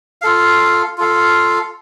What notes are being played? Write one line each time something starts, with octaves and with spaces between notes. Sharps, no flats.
F4 A4 F5
F4 A4 F5